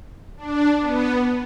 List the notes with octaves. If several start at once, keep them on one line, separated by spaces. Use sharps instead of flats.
D4
B3